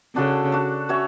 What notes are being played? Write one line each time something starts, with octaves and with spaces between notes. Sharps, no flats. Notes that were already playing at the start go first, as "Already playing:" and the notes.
C#3 D4 F#4 A4
D4 F#4 A4
C#4 F#4 C#5 E5